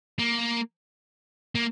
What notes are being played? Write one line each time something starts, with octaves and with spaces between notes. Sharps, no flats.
A#3
A#3